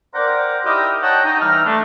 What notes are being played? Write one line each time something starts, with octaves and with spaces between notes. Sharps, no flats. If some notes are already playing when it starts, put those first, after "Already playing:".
A#4 C5 D5 F#5 G5 A#5
D#4 E4 G4 A#4 D#5
C#5 D#5 F#5 G5 A5 A#5
D#4
E3 G3 D#4 F6
A3 D4